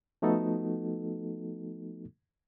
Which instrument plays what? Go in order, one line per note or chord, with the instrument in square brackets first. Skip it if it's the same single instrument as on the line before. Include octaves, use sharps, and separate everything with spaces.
[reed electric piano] F3 A3 B3 D#4 F#4 A4